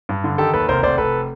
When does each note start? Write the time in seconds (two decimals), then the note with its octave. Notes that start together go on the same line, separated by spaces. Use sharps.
0.09 G2
0.24 D3
0.38 D#3 G4 A4
0.54 D#2 A4 B4
0.68 F1 A#4 C5
0.83 F1 C5 D5
0.98 F1 A4 B4